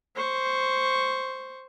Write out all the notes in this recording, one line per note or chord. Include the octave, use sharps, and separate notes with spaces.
C5 C#6